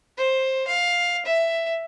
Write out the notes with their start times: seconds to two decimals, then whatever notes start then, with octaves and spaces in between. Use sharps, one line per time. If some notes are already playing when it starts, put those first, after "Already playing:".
0.17 C5
0.67 F5
1.25 E5